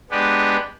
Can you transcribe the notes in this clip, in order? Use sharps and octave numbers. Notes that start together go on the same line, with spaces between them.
G#3 B3 D4 G4 B4